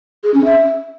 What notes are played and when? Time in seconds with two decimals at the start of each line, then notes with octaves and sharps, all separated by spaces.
0.24 G#4
0.34 C#4
0.45 E5